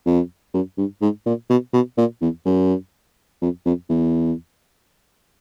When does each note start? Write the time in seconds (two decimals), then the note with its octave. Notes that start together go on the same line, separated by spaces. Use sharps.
0.06 F2
0.54 F#2
0.78 G2
1.02 G#2
1.26 A#2
1.50 B2
1.73 B2
1.97 A#2
2.21 E2
2.45 F#2
3.41 F2
3.66 F2
3.89 E2